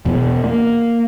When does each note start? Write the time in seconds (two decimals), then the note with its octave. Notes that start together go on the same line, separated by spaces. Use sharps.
0.05 E2 B2
0.44 A#3